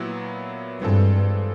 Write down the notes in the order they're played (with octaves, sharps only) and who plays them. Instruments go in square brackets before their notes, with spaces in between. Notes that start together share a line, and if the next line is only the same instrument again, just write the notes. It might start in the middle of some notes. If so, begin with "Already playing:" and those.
Already playing: [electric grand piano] A#2 F#3 B3 E4
[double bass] G2 [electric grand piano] E3 G#3 C4 F4 A4